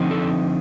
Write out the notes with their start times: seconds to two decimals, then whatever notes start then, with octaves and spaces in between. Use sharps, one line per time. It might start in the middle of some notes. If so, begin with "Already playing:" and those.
Already playing: D3 F3 C4 D#4
0.11 A4